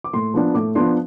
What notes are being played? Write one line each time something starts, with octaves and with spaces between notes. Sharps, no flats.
D6
A2 C6
F3 B3 D4
A2 D6
F3 B3 D4 C6